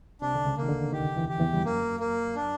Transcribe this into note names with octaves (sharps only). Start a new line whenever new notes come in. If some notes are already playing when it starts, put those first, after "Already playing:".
C2 C3 D4
D3
C#2 C#3
D#3 A#3
D2 D3
D#2 D#3 G4
E2 E3
G4
E2 E3
G3
F#2 F#3 A#3
A#3
D4